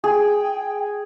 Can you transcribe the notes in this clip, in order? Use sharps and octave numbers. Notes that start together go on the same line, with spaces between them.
G#4 G5